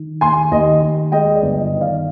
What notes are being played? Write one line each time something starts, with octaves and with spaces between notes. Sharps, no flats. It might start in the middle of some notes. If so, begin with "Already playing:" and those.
Already playing: D#3
D#2 G#5 C6
D#2 D#5
D#2
G#3 D#5 G5
D5
G1
D#5
D#3
D5 F5